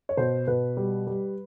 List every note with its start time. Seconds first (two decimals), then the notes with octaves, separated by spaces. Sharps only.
0.09 C#5
0.17 B2 C5
0.47 B2 B4
0.77 G3
1.07 G3